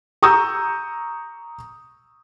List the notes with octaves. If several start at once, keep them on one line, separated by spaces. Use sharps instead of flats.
A#5 C#6 D#6 E6 G6